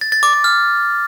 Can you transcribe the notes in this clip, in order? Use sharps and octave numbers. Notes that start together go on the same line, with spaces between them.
A6
A6
D6
D6
F6